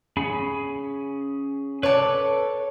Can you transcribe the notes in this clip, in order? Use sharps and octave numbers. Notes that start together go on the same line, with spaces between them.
C#4 G#4 B5
A4 B4 C#5 D6